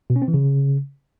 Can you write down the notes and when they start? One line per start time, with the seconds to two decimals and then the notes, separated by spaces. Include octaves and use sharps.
0.10 B2
0.16 C#4
0.22 C4
0.28 E3
0.34 C#3